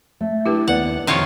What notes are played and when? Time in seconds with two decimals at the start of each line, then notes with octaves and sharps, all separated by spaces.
0.21 A3
0.46 D4 E4 G4 B4 G5
0.68 D#2 B3 D5 F#5
1.07 F2 C3 D#3 F4 C#5